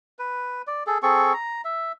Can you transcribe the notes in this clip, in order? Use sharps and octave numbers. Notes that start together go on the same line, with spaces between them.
B4
D5
G#4 A4
C4 G#4 A4 C#6
A#5
E5